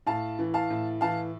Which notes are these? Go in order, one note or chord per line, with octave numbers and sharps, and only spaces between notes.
A2 F5 A5
E3
F5 A5
A2
E3 F5 A5